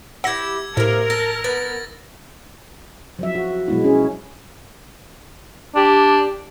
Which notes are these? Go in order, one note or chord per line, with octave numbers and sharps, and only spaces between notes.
E4 G4 F#5 E6 G#6 A#6
A2 C3 A#3 A#4
A4 A#6
B3 A6
F3 F#3 E5
F#4
B2 F#3 G#3 B3 E4
C#4 G#4
D4 G4